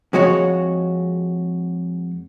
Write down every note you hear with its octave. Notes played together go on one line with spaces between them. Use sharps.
F2 G#3 F#4 C#5